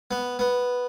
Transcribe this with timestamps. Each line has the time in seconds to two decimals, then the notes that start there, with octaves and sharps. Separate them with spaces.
0.11 B3
0.39 B3